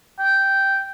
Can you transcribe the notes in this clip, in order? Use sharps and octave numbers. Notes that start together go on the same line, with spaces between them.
G5